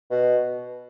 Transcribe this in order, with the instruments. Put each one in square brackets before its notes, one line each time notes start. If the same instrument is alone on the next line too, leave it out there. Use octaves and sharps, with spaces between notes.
[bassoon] B2